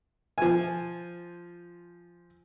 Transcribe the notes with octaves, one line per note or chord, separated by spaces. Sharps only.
F3 G#5